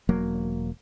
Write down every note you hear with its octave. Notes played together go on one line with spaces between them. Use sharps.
E1 F#3 A#3